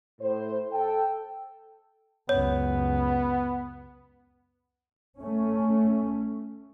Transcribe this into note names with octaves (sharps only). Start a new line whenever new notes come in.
A2 C5
A4 G5
C#2 F#2 B3 C#5
A3 C#4